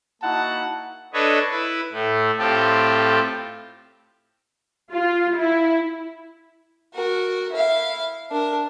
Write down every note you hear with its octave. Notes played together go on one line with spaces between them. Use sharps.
A#3 D#4 E4 F#4 F#5 A5
D4 A4 B4 C#5 D#5
E4 B4
A2 A3
A2 C4 F4 G4 A4
F4
E4
F#4 A#4
E4 F5
D4 A#4